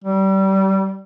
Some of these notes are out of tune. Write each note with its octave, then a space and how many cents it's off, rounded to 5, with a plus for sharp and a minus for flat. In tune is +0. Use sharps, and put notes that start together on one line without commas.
G3 -25